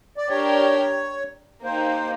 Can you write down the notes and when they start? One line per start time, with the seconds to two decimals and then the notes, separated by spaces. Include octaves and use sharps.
0.17 D5
0.28 D4 G4 A#4 C#5
1.64 A#3 D#4 G4 C5